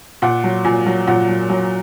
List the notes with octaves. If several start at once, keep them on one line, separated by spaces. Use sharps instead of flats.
A#2 F#5
F#3
A#2 G#5
F#3
A#2 F#5
F#3
F#3